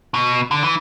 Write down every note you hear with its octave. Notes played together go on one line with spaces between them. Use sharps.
B2
D3
E3